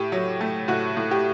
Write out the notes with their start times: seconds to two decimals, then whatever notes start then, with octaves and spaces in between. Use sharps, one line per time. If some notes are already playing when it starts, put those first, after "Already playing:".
Already playing: A2 G4
0.12 F#3
0.41 A3
0.68 A2 F#4
0.97 A2
1.11 G4